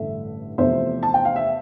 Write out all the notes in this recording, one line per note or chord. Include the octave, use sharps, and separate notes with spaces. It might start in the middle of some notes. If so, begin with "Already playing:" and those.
Already playing: A1 G2 D3 A3 E5
E2 C3 F3 A3 C5 E5
A5
G5
F5
E5